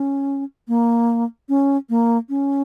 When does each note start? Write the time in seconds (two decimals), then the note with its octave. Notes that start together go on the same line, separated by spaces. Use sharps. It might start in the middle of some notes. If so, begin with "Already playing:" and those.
Already playing: C#4
0.68 A#3
1.49 C#4
1.89 A#3
2.29 C#4